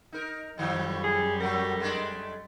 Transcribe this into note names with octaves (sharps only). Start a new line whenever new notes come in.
D#4 A#4
F#2 A2 D#3 F3 G3
G#4
F#3 A3 A#4
G#3 A3 D4